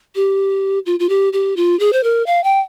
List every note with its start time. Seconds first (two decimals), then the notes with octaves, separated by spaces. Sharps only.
0.15 G4
0.86 F4
1.00 F4
1.09 G4
1.33 G4
1.57 F4
1.80 G#4
1.93 C5
2.04 A#4
2.26 F5
2.44 G5